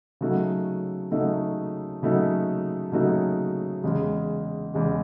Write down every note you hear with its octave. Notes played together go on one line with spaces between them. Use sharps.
C#3 F#3 A3 D#4 F#4
C#3 F#3 A3 D#4 F#4
C#3 F#3 A3 D#4 F#4
C#3 F#3 A3 D#4 F#4
E2 C#3 G#3
E2 C#3 G#3